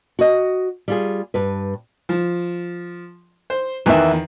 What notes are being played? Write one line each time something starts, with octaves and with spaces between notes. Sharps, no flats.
F#4 D#5
G3 F4 G#4
G2 B4
F3
C5
E2 D#3 E3 B3 E5